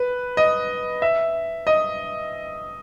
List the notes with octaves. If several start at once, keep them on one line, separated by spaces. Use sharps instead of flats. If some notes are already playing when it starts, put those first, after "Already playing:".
Already playing: B4
D#5
E5
D#5